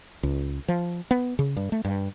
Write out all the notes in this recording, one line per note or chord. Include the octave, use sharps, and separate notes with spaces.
C#2
F3
B3
C#3
G2
A3
G2